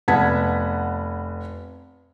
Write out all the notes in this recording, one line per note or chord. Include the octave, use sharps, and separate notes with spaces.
F1 B3 F#5 A5 G#6 B6